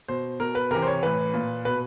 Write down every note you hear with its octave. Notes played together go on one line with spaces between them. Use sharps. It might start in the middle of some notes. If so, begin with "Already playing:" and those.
B2 C5
B2 A#4
B4
C3 E3 A#4
C5
C#5
A2 E3 B4
A#2
B2 B4